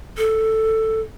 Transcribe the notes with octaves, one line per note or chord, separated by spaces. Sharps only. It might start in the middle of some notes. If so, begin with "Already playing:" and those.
A4